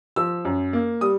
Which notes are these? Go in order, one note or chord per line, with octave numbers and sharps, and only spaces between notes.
F3 E6
F#2
A#3
G3 D#6